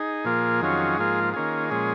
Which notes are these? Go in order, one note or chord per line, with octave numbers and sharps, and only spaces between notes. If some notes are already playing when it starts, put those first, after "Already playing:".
Already playing: D#4 G#4
A#2 F3 A#3 F4
F2 D#3 F#3 C#4 F4
G#2 F3 A#3 F4
D#3 A#3 C#4 F4 G#4
A#2 F3 G#3 C#4